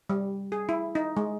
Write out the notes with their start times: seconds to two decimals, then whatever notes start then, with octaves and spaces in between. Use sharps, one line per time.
0.09 G3
0.52 G#4
0.69 E4
0.95 D#4
1.17 G#3